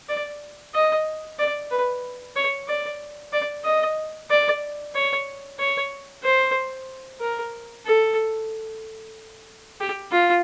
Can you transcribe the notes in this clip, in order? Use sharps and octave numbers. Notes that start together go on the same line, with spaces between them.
D5
D#5
D5
B4
C#5
D5
D5
D#5
D5
C#5
C#5
C5
A#4
A4
G4
F4